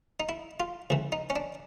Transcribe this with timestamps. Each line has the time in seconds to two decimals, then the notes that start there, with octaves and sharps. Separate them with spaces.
0.20 D#4
0.29 E4
0.60 F4
0.90 C#2 C#3 E3
1.12 D#4
1.30 C#4
1.36 D4